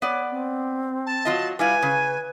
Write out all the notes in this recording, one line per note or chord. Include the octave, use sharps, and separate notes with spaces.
B3 C#5 D5
C4
A5
F#3 F4 D#5
G3 E4 F4 B4 G#5
C#3